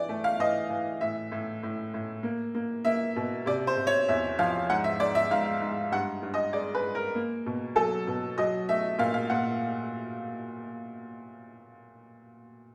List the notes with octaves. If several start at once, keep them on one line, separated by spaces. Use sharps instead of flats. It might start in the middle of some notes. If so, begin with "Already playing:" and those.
Already playing: E3 D5
A3
F5
E3 D#5
E3
A2 E5
A2
A2
A2
A#3
A#3
A#3 E5
B2
C3 D5
C5
C3
C#5
E2 E5
F3 F5
G#2 F#5
E5
G#2 D5
E5
G#2 F5
G#2
G2 F#5
G2
D#5
G#3 D5
B4
G#3
A#4
A#3
B2
F#3 A4
B2
F#3 D#5
A3 E5
A#2 F5
F5
A#2 F#5